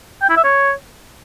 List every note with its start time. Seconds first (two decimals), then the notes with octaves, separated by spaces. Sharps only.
0.22 G5
0.29 E4
0.37 E5
0.44 C#5